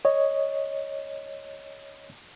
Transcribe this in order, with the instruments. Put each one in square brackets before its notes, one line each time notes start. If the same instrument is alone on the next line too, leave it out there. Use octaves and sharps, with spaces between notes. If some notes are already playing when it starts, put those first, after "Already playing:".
[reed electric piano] C#5 D#5